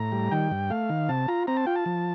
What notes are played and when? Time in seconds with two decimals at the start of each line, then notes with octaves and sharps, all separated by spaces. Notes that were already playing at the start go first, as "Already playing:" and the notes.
Already playing: A2 A#5
0.12 G3
0.31 D#3 G5
0.51 G2
0.70 A3 F5
0.89 D#3
1.09 C3 A5
1.28 F4 A#5
1.47 C4 A#5
1.57 A5
1.66 F4 G5
1.75 A5
1.86 F3